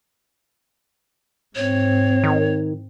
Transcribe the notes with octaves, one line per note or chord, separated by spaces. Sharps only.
G#2 C4 C#5
D#3